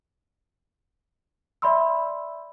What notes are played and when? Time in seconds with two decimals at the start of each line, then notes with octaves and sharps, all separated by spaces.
1.62 D5 E5 B5 C6 E6